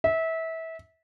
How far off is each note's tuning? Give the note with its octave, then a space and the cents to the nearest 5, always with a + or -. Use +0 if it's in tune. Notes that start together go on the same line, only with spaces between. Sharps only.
E5 -25